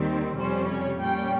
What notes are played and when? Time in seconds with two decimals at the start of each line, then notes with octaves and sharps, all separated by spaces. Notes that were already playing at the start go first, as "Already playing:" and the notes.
Already playing: D#2 D#3 G3 C4
0.38 F2 C3 G3 C#4 C5
0.69 C#5
1.00 A#2 G3 C#4 G5